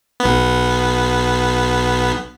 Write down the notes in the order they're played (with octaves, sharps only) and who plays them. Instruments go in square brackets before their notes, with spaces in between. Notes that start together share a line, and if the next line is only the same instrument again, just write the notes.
[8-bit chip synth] B1 B3